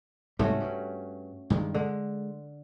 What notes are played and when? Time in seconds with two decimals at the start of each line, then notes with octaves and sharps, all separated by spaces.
0.39 C2 G#2 G3 A3 C#4 F#4
0.60 G2
1.50 G2 D#3 G#3
1.74 D3 G#3